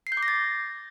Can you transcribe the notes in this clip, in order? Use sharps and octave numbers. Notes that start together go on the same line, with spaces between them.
C7
G6
D6
A#6
A6